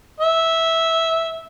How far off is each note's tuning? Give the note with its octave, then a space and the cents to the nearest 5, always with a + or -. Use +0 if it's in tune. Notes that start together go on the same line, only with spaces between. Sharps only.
E5 -10